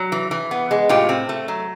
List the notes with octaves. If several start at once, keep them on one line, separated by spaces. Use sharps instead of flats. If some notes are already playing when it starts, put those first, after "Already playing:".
Already playing: F#3
E3
E3
B3
G#3
A2 F4 G4
C4
A3
F#3